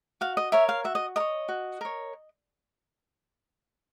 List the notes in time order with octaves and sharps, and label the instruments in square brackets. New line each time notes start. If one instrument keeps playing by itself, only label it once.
[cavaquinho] F#4 F5
D#5
A#4 C#5 E5
F5
F#4 E5
D#5
A#4 D#5
C#5
F#4
A#4 C#5